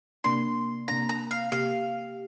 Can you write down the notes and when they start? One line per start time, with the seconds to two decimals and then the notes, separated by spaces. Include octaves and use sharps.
0.24 C3 A#3 D4 C6
0.88 C3 A#3 D4 A#5
1.09 A#5
1.31 F5
1.52 C3 A#3 G4 F5